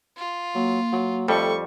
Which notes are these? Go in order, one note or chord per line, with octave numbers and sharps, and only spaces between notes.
F4
F#3 A#3
F#3
F2 G3 A3 C#6